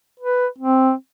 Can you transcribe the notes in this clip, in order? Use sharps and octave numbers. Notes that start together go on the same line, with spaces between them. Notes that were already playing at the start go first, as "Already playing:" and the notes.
B4
C4